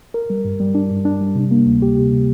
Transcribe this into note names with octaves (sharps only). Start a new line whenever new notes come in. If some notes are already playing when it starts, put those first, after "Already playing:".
A#4
G3
G2
G3
D4
G2
D4
G3
C3
A#3
D2
G4
C3
C3